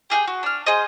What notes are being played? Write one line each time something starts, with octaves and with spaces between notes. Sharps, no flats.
G4 G#4 F#5 G5
F#4
D4 F6
G#4 C5 D#5